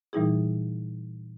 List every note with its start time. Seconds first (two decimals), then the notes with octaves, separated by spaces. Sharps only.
0.13 A#2 E3 G3 D#4 E4 G#4